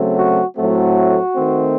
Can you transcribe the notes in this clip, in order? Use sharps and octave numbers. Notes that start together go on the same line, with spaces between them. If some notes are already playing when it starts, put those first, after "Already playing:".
Already playing: C#3 F#3 A3 C4
F#4
A2 F#3 A3 C4 F#4
D#3 A3 C4